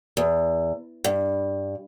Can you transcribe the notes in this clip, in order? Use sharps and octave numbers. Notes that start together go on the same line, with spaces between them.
E2
G2